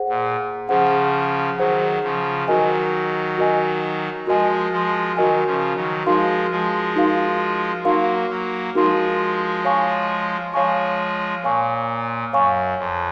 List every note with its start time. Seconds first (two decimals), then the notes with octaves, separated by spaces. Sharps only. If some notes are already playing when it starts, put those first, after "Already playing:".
Already playing: G#4 C5 F#5
0.09 A#2
0.69 C#3 F3 G#4 C5 F#5
1.58 D#3 F#3 G#4 C5 F#5
2.03 C#3 F3
2.48 D#3 F#3 F#4 A#4 D#5 G#5
3.38 F#4 A#4 D#5 G#5
4.27 F3 G#3 F#4 A#4 D#5 G#5
4.72 F3 G#3
5.16 D#3 F#3 F#4 A#4 D#5 G#5
5.46 C#3 F3
5.76 D#3 F#3
6.06 F3 G#3 D#4 F#4 A#4 F5 C6
6.51 F3 G#3
6.96 D#4 F#4 A#4 F5 C6
7.85 F#3 A#3 D#4 F#4 A#4 F5 C6
8.30 F#3 A#3
8.75 F3 G#3 D#4 F#4 A#4 F5 C6
9.65 C#5 F5 G#5 C#6
10.54 F3 G#3 C#5 F5 G#5 C#6
11.44 A#2 C#5 F5 G#5 C#6
12.33 F#2 C#5 F5 G#5 C#6
12.78 F2